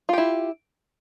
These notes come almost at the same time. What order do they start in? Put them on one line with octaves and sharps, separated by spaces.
F4 G4 E4